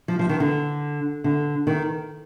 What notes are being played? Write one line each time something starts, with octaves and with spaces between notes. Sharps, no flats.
F3
F3
D#3
D3
D3
D#3